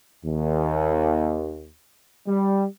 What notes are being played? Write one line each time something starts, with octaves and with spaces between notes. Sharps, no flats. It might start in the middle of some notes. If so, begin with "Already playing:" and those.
D#2
G3